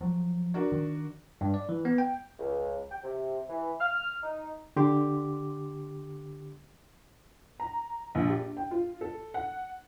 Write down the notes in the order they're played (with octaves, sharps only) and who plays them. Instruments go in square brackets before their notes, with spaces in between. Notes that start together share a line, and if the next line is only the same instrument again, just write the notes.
[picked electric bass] F3 F#3
[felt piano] D4 F#4 A#4
[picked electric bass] D#3
[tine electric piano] G2
D5
E3
B3
G5
[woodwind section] C#2
G5
C3
E3
F6
D#4
[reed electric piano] D3 G4 C6 D6
[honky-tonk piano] A#5
A#1
G4
G5
F4
A4
F#5